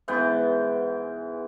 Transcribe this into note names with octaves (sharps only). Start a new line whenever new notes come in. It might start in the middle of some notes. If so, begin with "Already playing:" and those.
G#2 E3 B3 G5